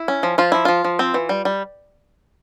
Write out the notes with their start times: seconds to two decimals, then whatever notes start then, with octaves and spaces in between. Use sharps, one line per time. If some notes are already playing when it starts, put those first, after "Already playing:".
Already playing: E4
0.08 C#4
0.23 F3
0.38 F3 F4
0.52 F3 E4
0.65 F3 F4
0.84 F3
0.99 C4
1.14 E3
1.29 G3
1.45 G3